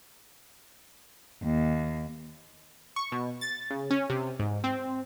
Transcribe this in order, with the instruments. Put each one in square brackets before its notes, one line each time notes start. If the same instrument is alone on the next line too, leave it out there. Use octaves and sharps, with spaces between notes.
[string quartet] D#2
[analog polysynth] C#6
B2
A6
C#3
C#4
C3
G#2
C4